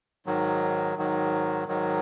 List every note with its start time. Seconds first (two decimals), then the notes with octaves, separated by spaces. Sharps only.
0.26 G#2 D#3 F#3
0.97 G#2 D#3 F#3
1.68 G#2 D#3 F#3